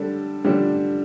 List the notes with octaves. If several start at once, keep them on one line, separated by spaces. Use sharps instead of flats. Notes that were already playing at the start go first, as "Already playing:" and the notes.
Already playing: D3 G3 D4 A4
D3 G3 D4